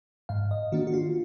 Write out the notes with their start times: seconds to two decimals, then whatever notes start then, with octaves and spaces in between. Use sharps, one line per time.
0.29 G#2 F5
0.51 D#5
0.72 D#3 A#3 D4 F#4
0.87 F#4
0.94 F4